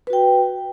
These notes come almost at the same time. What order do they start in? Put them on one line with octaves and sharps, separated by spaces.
B4 F#4 G5